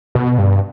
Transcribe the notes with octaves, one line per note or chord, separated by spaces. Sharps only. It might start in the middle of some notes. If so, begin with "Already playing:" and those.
B2
G2